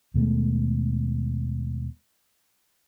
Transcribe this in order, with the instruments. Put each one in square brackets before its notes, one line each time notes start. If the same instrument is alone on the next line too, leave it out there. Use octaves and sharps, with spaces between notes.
[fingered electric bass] D#2 B2 G#3 A3